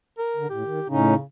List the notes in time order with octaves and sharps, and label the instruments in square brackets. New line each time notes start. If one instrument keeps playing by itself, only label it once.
[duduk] A#4
[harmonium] D3
[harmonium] A2 [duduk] G4
[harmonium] D#3
[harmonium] A2 C#4 D#4 [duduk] C#3